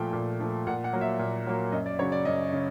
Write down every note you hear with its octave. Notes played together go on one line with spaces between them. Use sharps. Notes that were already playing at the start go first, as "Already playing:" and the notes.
Already playing: A#2 F3 A3 G5
A#2
F3 A3
A#2 F#5
F#5
F#3 A#3
E5
A#2
F#3 A#3
F#2 D#5
D5
C#3 F#3 C#5
D5
F#2 D#5
C#3